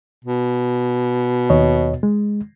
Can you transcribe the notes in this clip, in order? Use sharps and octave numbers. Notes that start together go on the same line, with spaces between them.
B2
D#2 C#5 D#5
G#3